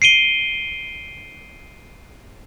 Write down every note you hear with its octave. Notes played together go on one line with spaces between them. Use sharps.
C7 D7 D#7 G7